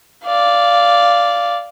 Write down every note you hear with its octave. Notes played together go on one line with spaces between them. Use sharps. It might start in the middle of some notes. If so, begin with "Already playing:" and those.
D5 F5